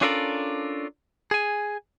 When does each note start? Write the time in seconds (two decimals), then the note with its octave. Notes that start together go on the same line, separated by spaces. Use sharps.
0.01 C#4 D4 F4 A4 A#4 D5
1.31 G#4 G#5